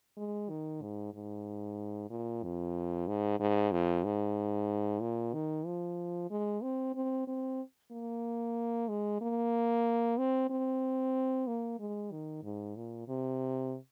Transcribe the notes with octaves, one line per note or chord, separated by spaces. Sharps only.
G#3
D#3
G#2
G#2
A#2
F2
G#2
G#2
F2
G#2
A#2
D#3
F3
G#3
C4
C4
C4
A#3
G#3
A#3
C4
C4
A#3
G#3
D#3
G#2
A#2
C3